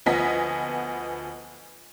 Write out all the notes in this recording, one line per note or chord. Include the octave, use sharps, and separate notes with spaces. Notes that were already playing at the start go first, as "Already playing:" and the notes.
D2 F3 B3 D#5 G#5 B6